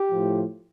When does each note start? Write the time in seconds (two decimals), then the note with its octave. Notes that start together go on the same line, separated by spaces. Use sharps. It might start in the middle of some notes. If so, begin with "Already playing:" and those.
Already playing: G4
0.11 A2 F3